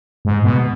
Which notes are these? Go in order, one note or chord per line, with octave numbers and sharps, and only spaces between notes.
G#2
B2